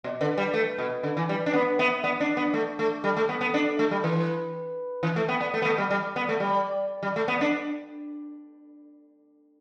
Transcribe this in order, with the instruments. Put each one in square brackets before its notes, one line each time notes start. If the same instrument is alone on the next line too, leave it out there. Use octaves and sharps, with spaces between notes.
[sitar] B2 [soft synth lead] D5
[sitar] D3 [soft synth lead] B4
[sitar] G3 [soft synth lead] B4
[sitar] A3
B2
D3
E3
G3
D4
[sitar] B3 [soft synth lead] B4
[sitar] B3 [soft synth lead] E5
[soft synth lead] E5
[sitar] B3 [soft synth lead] D5
[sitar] D4
B3
A3
A3
[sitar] G3 [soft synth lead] A4
[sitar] A3
B3
B3
D4
A3
G3
[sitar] E3 [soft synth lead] B4
[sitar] E3
[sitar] A3 [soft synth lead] E5
[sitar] B3 [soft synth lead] G5
[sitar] B3 [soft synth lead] D5
[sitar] A3 [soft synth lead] D5
[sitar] B3
A3
G3
G3
B3
A3
G3
[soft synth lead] D5
[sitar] G3
A3
B3
D4